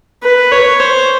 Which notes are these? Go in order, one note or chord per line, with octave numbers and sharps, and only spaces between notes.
B4
C#5
C5